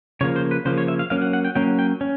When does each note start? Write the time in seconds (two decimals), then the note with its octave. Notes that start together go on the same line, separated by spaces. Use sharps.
0.21 C#3 F3 A#3 C#5
0.36 C5
0.51 B4
0.65 C#3 F3 A#3 C5
0.78 C#5
0.88 E5
0.99 F5
1.10 F#3 A#3 C#4 F5
1.22 F#5
1.33 F#5
1.45 G5
1.55 F#3 A#3 C#4 G5
1.79 G5
2.01 C#4